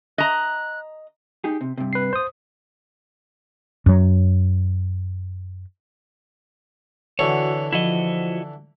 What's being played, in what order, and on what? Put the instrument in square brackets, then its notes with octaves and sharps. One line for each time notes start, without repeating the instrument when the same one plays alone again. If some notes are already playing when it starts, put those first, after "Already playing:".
[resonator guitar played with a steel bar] D#5 A#5 [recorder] F#6
[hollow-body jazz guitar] D#4 G4 G#4
C3
G2 C3
[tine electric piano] B4 C7
C5 D#6
[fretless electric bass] F#2 F#3
[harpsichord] D3 E3 C#6 [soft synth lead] F#4 [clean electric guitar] C#5
[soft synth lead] F3 [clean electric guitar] E4 F#4 D#5